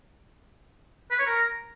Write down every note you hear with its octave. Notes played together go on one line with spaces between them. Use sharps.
B4
C#5
A#4